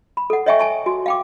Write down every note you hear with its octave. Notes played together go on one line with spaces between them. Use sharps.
B5
A4 F#5
C#5 D#5 E5 G5 G#5 C#6
G#5 A5 C#6
F#4 G#5
F5 G5 D6